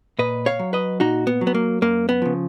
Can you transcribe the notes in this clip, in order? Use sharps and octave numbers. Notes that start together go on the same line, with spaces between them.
A#2 B4 D#5
C#5 F5
F#3
B4 D#5
A#2 D#4 F#4
B3
F#3
B3
A#3
F#2 A#3
B3
C#3 F3